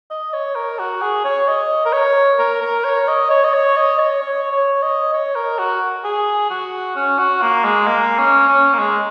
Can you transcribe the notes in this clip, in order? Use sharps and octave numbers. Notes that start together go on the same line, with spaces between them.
D#5
C#5
A#4
F#4
G#4
C#5
D#5
A#4
C#5
A#4
A#4
C#5
D#5
C#5
D#5
C#5
D#5
C#5
C#5
C#5
D#5
C#5
A#4
F#4
G#4
F#4
C#4
F#4
A#3
G#3
A#3
C#4
C#4
A#3
G#3